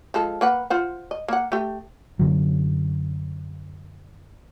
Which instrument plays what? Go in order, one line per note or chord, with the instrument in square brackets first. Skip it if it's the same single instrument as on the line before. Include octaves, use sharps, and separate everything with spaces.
[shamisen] F3 G#3 A4
A#3 B4 F#5
F4 C5 F#5
D#5
A#3 F#5
A3 G4
[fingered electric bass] F#2 D3 F#3